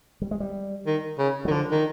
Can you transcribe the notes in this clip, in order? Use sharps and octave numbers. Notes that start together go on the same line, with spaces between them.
G3
G#3
G3
D#3
C#3
F#3
D#3
D3 F3
D#3